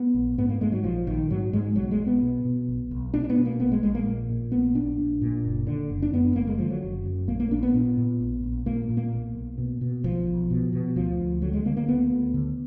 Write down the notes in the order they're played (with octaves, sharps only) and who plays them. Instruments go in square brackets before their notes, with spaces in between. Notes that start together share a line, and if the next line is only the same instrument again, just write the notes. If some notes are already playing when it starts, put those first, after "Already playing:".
Already playing: [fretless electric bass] B3
A#1
G#2 B3
A#3
G#2 G#3
F#3
A#1 F3
A#1 D#3
G#2 F#3
G#2 G#3
B1 F#3
G#3
B1
B3
B2
B2
B1
B1
B2 D4
D4
B3
B2
A#3
A#1 B3
G#3
A#1 G#3
A#3
A#2
A#2
A#1 B3
A#1 D4
A#2
A#2
F#1
D3
F#1
D4
F#2 B3
F#1 A#3
G#3
D3 F3
F#3
F#1
F#2
A#1 A#3
A#3
A#1 D4
B3
A#2
A#2
A#1
A#1
A#2 A#3
A#2
A#3
B1
B1
B2
B2
B1 F3
B1
B2
B2
D2 F3
D2
D3 F#3
G#3
D3 A#3
A#3
D2 B3
D2
D3